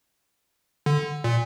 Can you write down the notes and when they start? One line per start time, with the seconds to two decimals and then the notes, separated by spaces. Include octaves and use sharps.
0.86 D3
1.24 A#2